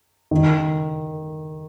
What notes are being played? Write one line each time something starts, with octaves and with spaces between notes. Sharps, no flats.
D#3